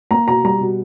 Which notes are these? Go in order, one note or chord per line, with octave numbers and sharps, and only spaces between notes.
A#3 A#5
B2 A#5
G3 A#5
B2